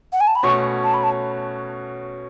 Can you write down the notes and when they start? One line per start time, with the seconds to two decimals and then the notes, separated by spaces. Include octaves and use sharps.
0.13 F#5
0.21 G#5
0.27 A5
0.35 B5
0.43 B2 A3 C#4 F#4 C#5 C#6
0.84 A5
0.94 B5
1.03 A5